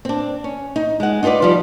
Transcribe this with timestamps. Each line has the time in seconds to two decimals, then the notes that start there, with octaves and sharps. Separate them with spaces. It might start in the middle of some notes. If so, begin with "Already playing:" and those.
0.05 C4 D4
0.44 C#4
0.76 D#4
1.00 G#3 F#5
1.23 D#4 F4 A4 B4 D5
1.42 F3 G3